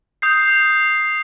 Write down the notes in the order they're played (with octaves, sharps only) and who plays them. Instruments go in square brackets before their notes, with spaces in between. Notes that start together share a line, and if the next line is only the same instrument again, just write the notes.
[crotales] D#6 G6 C7